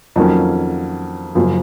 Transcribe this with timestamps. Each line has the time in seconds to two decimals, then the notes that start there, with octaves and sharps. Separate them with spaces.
0.16 F2 D#3 F#3 A#3 C#4
1.35 F#1 F#2 F3